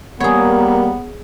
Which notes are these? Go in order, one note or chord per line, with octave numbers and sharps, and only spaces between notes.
G3 A#3 B3 G#4 A#4 C#5